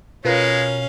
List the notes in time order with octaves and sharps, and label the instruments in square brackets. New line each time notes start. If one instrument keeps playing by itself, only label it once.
[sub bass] B2 [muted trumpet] G#3 [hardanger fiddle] C#4 F5 [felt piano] F4 A#4 B4